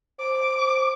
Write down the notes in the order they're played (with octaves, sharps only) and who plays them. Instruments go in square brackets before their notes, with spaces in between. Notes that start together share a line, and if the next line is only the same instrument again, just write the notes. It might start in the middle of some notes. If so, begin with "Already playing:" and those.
[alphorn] C5 [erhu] D6